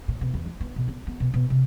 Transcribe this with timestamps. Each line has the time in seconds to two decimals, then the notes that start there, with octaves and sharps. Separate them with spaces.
0.08 A#2
0.21 B2
0.34 E2
0.46 F3
0.61 B3
0.76 B2
0.88 B3
1.07 B3
1.20 B2
1.34 B2
1.50 C3